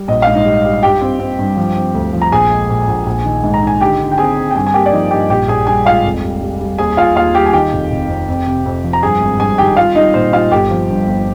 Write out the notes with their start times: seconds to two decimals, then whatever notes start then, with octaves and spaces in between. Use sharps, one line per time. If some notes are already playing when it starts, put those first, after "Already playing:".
Already playing: G3
0.08 A#1 D#5
0.22 G#2 F5
0.35 D#4 D#5
0.45 G3
0.65 G3
0.83 G2 G4 G5
1.01 C4
1.20 C4
1.39 G2
1.57 F3
1.76 C4
1.94 D2
2.13 F3
2.22 A#5
2.32 A#1 G#4 G#5
2.50 G#3
2.69 A#2
2.87 A#1
3.06 A#1
3.25 D#3
3.44 G#2
3.54 A#5
3.63 D#3 G#5
3.80 D3 G4 G5
4.00 D3
4.12 G5
4.18 C4 G#4 G#5
4.37 C4
4.51 G5
4.55 G2 G#4 G#5
4.67 G#5
4.74 A#3 G4 G5
4.86 D5
4.92 F3 D#4 D#5
5.11 G2 G4 G5
5.29 A#1 G4 G5
5.48 A#1 G#4 G#5
5.67 G3 G#4 G#5
5.86 G#2 F4 F5
6.05 F1
6.23 G3
6.41 G3
6.60 G3
6.78 D#2 G#4 G#5
6.97 D#2 F4 F5
7.16 D#2 F4 F5
7.34 G3 G4 G5
7.46 G#5
7.53 D#3 G4 G5
7.72 F1
7.91 F1
8.09 F2
8.29 F2
8.47 C3
8.66 F2
8.84 F3
8.93 A#5
9.03 G2 G#4 G#5
9.21 G#1
9.39 G2 G#4 G#5
9.58 D#3 G4 G5
9.77 G3 F4 F5
9.95 G3 D#4 D#5
10.14 A#2 C5
10.33 G3 F4 F5
10.51 G1 G4 G5
10.71 F3
10.89 G2
11.07 G1